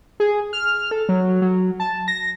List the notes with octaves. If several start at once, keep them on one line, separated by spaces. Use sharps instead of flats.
G#4
F6
A4
F#3
F#3
A5
A#6